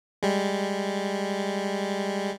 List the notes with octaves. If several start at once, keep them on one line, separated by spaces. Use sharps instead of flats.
G3 G#3